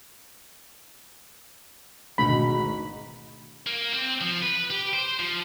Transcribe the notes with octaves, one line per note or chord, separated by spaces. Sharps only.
G#1 D2 B2 B5
F#5 A#5 C#6
A#3
C4
F3
B4
G4
C5
F3